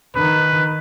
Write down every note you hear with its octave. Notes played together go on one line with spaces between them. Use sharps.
D#3 B4